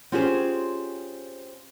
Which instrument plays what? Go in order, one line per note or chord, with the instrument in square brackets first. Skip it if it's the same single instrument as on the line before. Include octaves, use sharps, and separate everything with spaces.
[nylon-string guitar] C4 C#4 F4 G4 G#4 C5